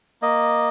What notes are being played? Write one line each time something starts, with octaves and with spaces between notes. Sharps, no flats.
A#3 D#5